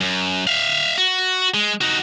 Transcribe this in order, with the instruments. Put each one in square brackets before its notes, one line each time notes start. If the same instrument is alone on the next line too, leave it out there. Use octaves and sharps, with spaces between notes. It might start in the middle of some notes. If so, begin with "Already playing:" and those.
[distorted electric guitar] F#2
E5 F5
F#4
G#3
D#4 F#4